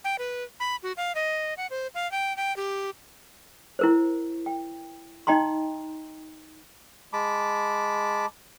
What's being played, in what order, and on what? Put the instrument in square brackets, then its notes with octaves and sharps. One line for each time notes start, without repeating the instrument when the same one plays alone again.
[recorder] G5
B4
B5
F#4
F5
D#5
F#5
C5
F5
G5
G5
G4
[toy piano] E4 A#4 C5
G5
D#4 D#5 G5 A#5 C6
[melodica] G#3 A5 B5 D6